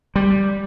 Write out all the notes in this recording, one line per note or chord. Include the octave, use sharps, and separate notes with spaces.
G3